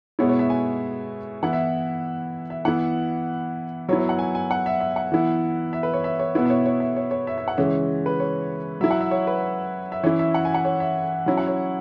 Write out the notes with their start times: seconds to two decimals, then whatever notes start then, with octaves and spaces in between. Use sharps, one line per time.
0.19 B2 G#3 B3 E4 C#5
0.29 C#5
0.39 E5
0.50 G#5
1.43 E3 B3 E4 F#5
1.53 E5
2.50 E5
2.65 E3 B3 E4 F#5
3.89 F#3 B3 E4 C#5
3.99 C#5
4.09 F#5
4.19 G#5
4.35 G#5
4.51 F#5
4.66 E5
4.80 E5
4.96 F#5
5.12 E3 B3 E4
5.73 E5
5.83 B4
5.93 C#5
6.04 E5
6.19 C#5
6.35 B2 B3 E4 B4
6.46 E5
6.50 C#5
6.66 C#5
6.80 E5
6.96 C#5
7.11 C#5
7.27 E5
7.38 E5
7.48 F#5
7.57 C#3 E3 G#3 C#4 E5
8.06 B4
8.20 C#5
8.81 F#3 E4 E5
8.91 F#5
9.01 E5
9.11 C#5
9.27 B4
9.92 E5
10.03 E3 C#4 E4 C#5
10.19 E5
10.34 F#5
10.45 G#5
10.54 F#5
10.65 C#5
10.80 E5
11.26 F#3 C#4 E4
11.38 F#5
11.47 C#5